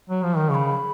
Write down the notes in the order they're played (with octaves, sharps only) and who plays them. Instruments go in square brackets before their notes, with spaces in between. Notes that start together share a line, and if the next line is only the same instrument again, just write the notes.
[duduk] F#3
F3
D#3
[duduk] C#3 [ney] C#6
[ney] B5